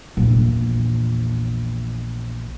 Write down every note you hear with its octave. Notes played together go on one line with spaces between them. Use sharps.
A#1 E2